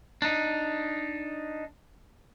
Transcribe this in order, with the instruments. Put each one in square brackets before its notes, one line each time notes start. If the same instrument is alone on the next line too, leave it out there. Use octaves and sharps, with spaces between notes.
[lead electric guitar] D4 D#4